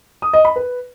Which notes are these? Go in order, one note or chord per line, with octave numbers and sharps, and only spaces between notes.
D#6
D#5
B5
B4